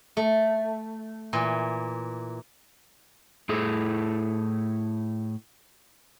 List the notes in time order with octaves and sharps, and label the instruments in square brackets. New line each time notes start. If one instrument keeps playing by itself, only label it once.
[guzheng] A3
A#2 E3
[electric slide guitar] A2 E4 G#4 A4